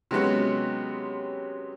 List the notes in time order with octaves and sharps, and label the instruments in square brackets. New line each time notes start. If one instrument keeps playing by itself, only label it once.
[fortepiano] C3 F#3 G#3 B3 C#4